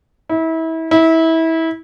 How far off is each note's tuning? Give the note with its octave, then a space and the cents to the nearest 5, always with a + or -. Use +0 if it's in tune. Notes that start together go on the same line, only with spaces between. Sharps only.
E4 -30
E4 -25